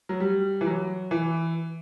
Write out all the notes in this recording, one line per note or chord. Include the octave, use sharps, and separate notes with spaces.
F#3
G3
E3
F#3
E3